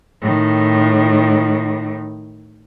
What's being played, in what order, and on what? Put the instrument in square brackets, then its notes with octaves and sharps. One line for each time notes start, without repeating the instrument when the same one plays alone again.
[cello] A2 D#3